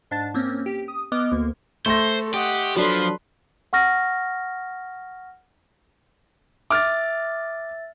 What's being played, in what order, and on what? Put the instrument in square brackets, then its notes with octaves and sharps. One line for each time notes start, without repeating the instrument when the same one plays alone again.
[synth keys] G#2 D4 A5 A6
A#3 C4 C#4
G4
D#6
B3 D#5 D6 F6
D2 A#3
[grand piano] A3 C6 A#6 [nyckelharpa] A4 [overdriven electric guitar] C5
[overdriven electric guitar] G4 [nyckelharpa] D#5 F#5
[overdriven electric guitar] F3 [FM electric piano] F#3 D4 A4 [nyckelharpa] B4 C6
[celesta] F#5 C#6 F6 A#6
[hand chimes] E5 A6 [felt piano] D6 F6